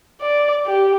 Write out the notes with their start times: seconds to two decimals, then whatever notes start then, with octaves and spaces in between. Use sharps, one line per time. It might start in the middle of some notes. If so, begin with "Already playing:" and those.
0.21 D5
0.66 G4